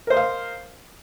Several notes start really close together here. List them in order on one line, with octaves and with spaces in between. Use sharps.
A#4 C5 D#5 F5